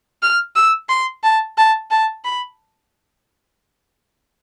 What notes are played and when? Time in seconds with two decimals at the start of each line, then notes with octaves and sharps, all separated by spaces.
0.23 F6
0.56 E6
0.89 C6
1.24 A5
1.58 A5
1.91 A5
2.25 B5